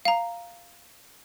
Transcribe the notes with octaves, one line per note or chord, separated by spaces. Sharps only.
F5 A#5